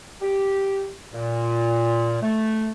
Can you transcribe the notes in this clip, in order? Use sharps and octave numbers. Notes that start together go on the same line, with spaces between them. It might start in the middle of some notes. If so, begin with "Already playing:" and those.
G4
A#2
A3